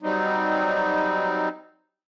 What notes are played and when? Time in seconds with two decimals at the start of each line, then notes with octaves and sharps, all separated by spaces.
0.02 F#3 G3 C4 D#4